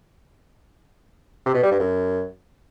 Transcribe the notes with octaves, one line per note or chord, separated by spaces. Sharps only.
C3
B2
G3
G2
F#2